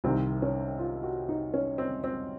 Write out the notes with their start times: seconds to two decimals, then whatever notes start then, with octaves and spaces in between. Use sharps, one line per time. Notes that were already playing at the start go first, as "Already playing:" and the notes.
0.04 C2 C3 D#3 C4
0.42 C#4
0.79 F4
1.03 F#4
1.29 D#4
1.54 C#4
1.78 C4
2.04 C4